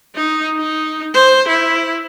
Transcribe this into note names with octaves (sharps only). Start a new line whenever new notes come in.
D#4
D#4
C5
E4